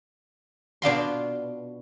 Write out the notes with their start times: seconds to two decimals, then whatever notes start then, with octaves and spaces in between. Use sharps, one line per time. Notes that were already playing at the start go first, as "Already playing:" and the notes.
0.82 B2 D4 F4 C6